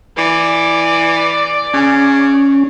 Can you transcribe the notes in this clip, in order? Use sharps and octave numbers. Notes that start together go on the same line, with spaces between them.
E3 D5
C#3 C#4